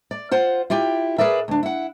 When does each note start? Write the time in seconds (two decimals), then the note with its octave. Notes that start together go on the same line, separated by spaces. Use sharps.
0.11 D5
0.31 F4 C5 F#5
0.70 E4 F4 G4 G5
1.18 G#4 A#4 B4 D5 E5
1.48 D2 D4
1.63 E4 F#5